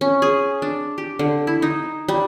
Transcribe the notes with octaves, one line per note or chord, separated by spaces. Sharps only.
C#4
G#4
D4
G4
D3
E4
D#4
G3